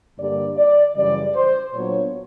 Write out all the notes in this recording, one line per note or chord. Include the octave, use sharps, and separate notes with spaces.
G2 D3 G3 A#3 D5
D5
F#2 C#3 E3 G3 D5
C5
A#2 F#3 B3 D4 C#5